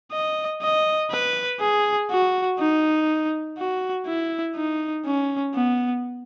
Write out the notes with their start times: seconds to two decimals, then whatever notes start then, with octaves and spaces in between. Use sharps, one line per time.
0.12 D#5
0.62 D#5
1.11 B4
1.60 G#4
2.10 F#4
2.59 D#4
3.58 F#4
4.07 E4
4.56 D#4
5.05 C#4
5.55 B3